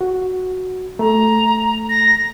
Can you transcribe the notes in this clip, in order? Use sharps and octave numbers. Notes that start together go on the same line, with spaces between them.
F#4
A3 A#5
A#6